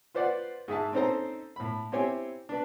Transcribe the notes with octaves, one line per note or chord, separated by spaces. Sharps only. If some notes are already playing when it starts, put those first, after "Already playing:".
F4 B4 C5 D5 F#5
G#2 G#4 E5 A5
C4 C#4 D#4 A4 C5 A#5
A2 B5
C4 E4 G4 C5 C#5 G#5
D4 B4